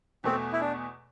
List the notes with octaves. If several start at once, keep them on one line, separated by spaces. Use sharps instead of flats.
E2 B2 A3 C4
E4
D4